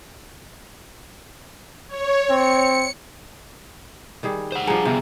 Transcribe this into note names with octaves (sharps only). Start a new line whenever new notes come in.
C#5
C4 C#7
D#3 G3 G#4
C5 F#5
G2 F3 G#4 G#5 A#5
C3 B3 F4